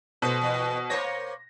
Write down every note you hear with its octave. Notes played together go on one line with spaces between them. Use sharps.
B2 A4 C5
E2
A#3 C5 C#5 A#6